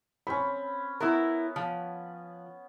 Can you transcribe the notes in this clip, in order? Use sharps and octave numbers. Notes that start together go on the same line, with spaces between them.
C4 C#4 B5
B3 E4 A#4 B4
F3